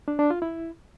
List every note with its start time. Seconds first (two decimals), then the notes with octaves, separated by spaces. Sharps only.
0.08 D4
0.19 D4
0.30 F4
0.42 E4